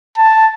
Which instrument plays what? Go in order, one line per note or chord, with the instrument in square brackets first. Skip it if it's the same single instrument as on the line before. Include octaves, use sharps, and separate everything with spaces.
[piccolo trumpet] A5